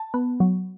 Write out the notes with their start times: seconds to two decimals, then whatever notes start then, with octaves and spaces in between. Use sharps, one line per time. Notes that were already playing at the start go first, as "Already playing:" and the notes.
Already playing: A5
0.14 B3
0.40 F#3